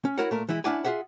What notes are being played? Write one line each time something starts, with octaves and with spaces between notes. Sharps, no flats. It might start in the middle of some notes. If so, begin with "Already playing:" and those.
C#4
E4 F#4 A#4 C#5 F#5
A#2 A3 A#4
E3 G#3 E4
C#4 D4 E4 D5 F#5 G#5
F4 G4 G#4 E5 F#5